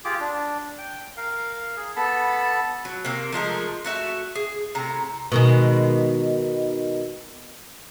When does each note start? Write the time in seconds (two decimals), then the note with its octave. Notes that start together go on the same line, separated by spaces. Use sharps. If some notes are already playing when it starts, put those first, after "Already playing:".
0.05 F4 G4 G#4 D6
0.20 D4
0.78 G5
1.17 A#4 F5
1.77 G#4
1.96 B3 A4 A5 B5
2.85 F#3
3.05 C3 A#3
3.32 F3 G#3 A3 A#4
3.84 A3 F#4 E5
4.35 G#4
4.75 A2 C3 A#5
5.32 B2 D#3 G#3